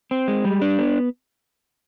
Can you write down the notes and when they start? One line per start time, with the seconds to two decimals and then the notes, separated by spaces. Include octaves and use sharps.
0.11 C4
0.28 G#3
0.45 G3
0.62 D4
0.79 B3